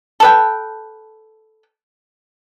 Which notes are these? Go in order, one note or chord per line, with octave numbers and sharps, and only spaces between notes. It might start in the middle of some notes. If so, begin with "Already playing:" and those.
A4 B4 G5